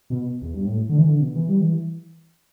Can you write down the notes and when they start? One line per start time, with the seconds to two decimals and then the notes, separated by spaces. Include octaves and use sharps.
0.10 B2
0.42 E2
0.53 G2
0.66 A2
0.90 D3
0.98 E3
1.05 D3
1.21 B2
1.36 E3
1.49 G3
1.61 E3